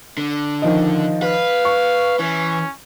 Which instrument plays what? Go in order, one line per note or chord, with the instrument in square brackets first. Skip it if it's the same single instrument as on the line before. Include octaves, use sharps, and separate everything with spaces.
[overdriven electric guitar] D3
[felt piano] D#3 F3 D#5
[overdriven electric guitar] B4 [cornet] F5
[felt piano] C#6
[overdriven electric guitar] E3 [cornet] C#4